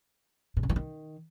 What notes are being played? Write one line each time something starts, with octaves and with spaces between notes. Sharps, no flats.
A#2
C3
E3
D#3